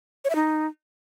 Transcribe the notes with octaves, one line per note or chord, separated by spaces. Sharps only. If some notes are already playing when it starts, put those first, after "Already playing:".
C#5
E5
D#4